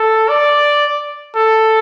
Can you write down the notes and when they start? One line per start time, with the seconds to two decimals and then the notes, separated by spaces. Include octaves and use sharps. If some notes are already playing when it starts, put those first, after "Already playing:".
Already playing: A4
0.29 D5
1.36 A4